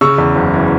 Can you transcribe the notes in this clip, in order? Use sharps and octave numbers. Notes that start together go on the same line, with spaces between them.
C#3 C#6 E6
E2
F#1
E3